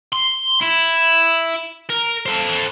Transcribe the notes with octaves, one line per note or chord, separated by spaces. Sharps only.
C6
E4
A#4
A4 C5